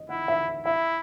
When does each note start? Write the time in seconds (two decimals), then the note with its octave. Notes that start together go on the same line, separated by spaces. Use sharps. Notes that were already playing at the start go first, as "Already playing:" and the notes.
Already playing: D#5
0.09 E4 F#5
0.28 E5
0.66 E4 E5